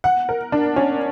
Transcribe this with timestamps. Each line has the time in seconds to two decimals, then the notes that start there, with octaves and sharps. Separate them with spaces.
0.04 F#5
0.29 A#4
0.52 D4
0.76 C#4